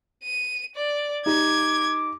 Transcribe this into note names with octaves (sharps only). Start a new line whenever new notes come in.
D#7
D5
D#4 G4 D6 G#6